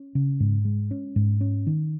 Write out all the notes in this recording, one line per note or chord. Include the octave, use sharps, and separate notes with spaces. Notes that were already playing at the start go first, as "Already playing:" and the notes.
Already playing: C#4
C#3
G#2
G#3
C#4
G#2
C#4
D#3